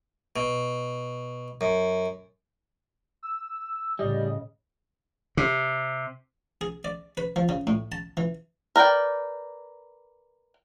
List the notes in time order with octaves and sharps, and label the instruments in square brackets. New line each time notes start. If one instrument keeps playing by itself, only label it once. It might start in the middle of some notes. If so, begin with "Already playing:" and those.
[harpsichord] B2
F#2
[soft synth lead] E6
[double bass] A2 C#3 [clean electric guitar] G3 [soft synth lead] D#5
[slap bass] C3
[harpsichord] G#4
D5
B4
F3
C#3
A2
A5
E3
[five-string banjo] A#4 B4 D5 G5